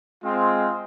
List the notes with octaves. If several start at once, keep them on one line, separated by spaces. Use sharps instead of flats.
G#3 C4 F4